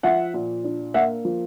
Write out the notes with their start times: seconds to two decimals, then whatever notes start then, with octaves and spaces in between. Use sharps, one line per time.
0.03 F3 E5 F#5
0.34 A#2
0.64 D4
0.94 A#3 E5 F#5
1.25 F3